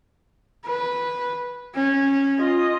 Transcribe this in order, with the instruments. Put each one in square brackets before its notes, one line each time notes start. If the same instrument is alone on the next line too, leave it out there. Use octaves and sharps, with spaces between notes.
[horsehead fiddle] B4
C#4
[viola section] F4 D#5